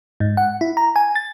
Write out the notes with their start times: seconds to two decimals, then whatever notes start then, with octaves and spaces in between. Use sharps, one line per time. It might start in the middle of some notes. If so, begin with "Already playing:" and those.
0.20 G#2
0.37 F#5
0.61 E4
0.77 A#5
0.96 G#5
1.15 A6